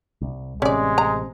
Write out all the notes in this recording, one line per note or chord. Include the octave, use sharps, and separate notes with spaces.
C2
A1 C3 G#3 C#4 D5
A#5